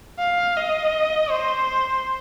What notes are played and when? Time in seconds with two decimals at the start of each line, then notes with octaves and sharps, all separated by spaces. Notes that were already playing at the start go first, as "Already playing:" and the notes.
0.19 F5
0.57 D#5
1.31 C5